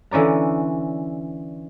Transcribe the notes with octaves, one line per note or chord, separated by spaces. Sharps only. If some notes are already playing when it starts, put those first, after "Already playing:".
D3 E3 C#4 D5 A#5